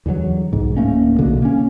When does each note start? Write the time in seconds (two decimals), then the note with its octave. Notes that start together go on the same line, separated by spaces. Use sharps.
0.06 E2 D3 D#3 F#3
0.53 B1 G#2
0.77 D1 A3 A#3 C#4
1.19 B1 B2 D3
1.42 A#3 C#4